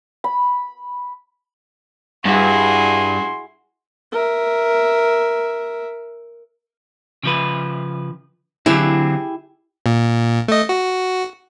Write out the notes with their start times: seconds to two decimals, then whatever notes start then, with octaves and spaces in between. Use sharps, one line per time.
0.24 B5
2.26 G2 E4 F#4 G#4 C6
4.12 A#4 E5
7.23 C#3 F3 B4
8.66 D3 F#3 C4 E4 G4 G#4
9.86 A#2
10.48 A3 D#5
10.69 F#4